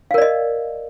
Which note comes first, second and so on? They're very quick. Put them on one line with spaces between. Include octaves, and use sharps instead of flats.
F5 A#4 D5 D#5